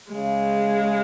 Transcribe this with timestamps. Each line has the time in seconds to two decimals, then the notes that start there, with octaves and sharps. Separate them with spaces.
0.12 C#3 G#3